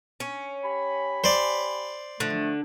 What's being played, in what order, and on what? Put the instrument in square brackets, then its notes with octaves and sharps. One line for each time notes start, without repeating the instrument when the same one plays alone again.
[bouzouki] C#4
[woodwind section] G4 G#5 B5
[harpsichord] C5 D5
[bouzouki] D3 [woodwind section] F3 A3